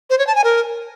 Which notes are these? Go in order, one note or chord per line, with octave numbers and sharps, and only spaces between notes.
C5
C#5
A5
G#5
A#4